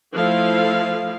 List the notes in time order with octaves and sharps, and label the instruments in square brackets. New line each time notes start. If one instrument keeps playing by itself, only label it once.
[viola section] F3 A3 E4 A4 F5